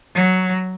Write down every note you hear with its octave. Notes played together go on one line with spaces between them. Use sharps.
F#3